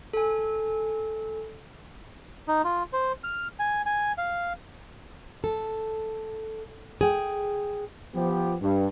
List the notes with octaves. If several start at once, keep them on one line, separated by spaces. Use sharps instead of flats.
A4 G#5
D#4
F4
C5
F6
G#5
G#5
F5
A4
G#4 G5
F3 B3 G4
G2